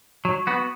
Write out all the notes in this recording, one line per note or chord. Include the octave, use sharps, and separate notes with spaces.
F#3
B3 F#4